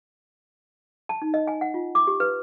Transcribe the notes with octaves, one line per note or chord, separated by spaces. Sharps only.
A5
D#4
D#5
G#5
F#5
F4
D6
G4
B4